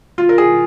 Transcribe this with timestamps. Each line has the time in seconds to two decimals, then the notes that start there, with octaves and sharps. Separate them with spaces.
0.18 F4
0.29 A#4
0.38 G#4